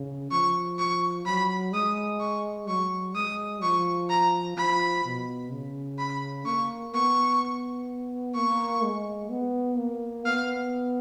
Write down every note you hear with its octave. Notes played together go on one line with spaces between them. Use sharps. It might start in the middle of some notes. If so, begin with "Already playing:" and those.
Already playing: C#3
F3 C#6
C#6
F#3 B5
G#3 D#6
C#6
F#3 C#6
G#3 D#6
F3 C#6
A#5
F3 B5
B2
C#3
B5
A#3 C#6
B3 C#6
A#3 C#6
G#3
B3
A#3
B3 F5